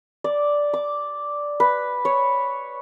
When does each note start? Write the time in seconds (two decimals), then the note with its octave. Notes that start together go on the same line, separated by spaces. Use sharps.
0.24 D5
0.73 D6
1.60 B4
2.05 C#5